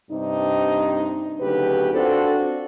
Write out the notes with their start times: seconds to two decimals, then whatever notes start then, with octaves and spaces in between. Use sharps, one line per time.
0.11 G2 C3 C4 D4 D#4
1.40 D2 C#3 F#3 D#4 G4 B4
1.93 C4 D4 F4 F#4 A4 C5